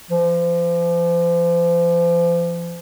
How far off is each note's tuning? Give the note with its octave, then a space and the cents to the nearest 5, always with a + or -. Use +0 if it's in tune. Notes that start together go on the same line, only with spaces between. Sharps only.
F3 -35